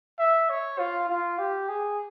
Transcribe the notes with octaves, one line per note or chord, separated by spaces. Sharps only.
E5
C#5
F4
F4
G4
G#4